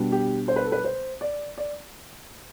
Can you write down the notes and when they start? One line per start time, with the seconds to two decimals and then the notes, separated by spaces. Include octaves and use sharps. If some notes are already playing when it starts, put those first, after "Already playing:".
Already playing: B2 G3 B3 D4
0.12 G4
0.48 C5
0.56 B4
0.65 A4
0.72 B4
0.84 C5
1.21 D5
1.58 D5